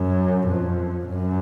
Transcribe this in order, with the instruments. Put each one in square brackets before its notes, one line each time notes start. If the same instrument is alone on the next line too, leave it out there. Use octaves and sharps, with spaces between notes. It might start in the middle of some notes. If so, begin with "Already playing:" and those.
Already playing: [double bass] F#2
F2
F#2